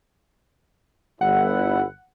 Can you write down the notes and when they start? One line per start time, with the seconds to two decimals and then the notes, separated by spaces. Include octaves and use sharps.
1.21 G1 E4 F#5